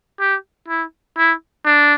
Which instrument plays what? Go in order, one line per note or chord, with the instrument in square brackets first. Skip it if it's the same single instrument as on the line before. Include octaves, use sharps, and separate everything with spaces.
[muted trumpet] G4
E4
E4
D4